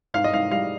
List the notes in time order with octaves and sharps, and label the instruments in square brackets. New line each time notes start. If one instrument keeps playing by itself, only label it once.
[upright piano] G#2 F5
D#5
G#2 F5
G3 F5